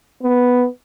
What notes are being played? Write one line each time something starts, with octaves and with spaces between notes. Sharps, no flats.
B3